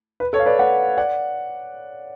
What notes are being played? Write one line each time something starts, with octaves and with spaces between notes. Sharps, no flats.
B4
A4 C#5
F5
B4 D5
D5 F#5
D5 F#5